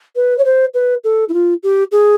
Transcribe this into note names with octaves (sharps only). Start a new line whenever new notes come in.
B4
C#5
C5
B4
A4
E4
F4
G4
G#4